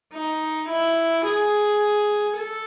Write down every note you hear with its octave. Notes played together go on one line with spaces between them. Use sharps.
D#4
E4
G#4
A4